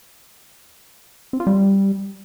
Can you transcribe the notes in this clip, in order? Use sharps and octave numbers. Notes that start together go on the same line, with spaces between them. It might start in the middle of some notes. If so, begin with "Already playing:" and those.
C4
F4
G3